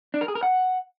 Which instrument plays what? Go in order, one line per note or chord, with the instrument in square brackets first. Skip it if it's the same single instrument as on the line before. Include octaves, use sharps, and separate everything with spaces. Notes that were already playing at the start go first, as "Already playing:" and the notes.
[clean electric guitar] D4
A#4
G#4
A#4
F#5